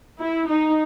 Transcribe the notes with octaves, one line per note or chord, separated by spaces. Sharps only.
E4
D#4